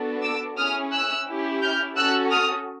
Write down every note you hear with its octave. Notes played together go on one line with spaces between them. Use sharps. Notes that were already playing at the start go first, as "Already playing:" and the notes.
Already playing: B3 D4 F#4 A4
D6 E6
C#4 E4 G#4 D#6 F6
E6 F#6
C#4 E4 G4
F6 G6
C#4 F#4 A4 E6 F#6
D#6 F6